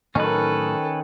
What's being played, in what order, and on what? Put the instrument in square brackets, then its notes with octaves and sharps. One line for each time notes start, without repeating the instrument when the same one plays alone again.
[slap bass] A2 F#3 [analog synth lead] D#3 [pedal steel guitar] C#4 B4 [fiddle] A4